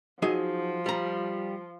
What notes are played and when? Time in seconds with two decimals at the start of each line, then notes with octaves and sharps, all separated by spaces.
0.22 F3 F#3 D#4 G#4
0.86 G3 A#5